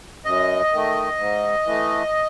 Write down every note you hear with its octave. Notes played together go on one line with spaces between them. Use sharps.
F#2 D#5
D#3 A3
G#2
E3 A3